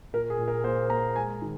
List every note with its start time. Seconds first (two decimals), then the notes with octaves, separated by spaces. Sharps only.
0.13 A#2 A#4
0.30 G#4
0.38 A#2
0.48 A#4
0.64 A#3 C5
0.90 A#3 A#5
1.16 G#3 G#5
1.42 D#3